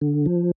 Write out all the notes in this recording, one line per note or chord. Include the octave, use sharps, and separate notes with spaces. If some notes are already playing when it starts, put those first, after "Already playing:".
D3
F3